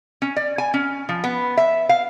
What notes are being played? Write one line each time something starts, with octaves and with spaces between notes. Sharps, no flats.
C#4
D5
G#5
C#4
F3
B3
E5
F5